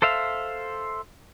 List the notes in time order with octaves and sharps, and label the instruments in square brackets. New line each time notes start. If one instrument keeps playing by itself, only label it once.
[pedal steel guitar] A4 C5 E5 F5